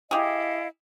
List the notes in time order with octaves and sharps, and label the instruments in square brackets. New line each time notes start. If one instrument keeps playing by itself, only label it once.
[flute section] E4 D#5 F5 [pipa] G4 G#4